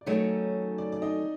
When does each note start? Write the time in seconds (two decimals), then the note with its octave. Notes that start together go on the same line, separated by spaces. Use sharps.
0.01 D5
0.06 D#3 F#3 A3 C#4 D#4 D#5
0.78 D5
0.92 D5
1.02 D#4 D#5